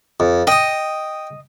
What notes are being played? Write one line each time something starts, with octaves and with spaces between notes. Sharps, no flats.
F2
D#5 G5 D#6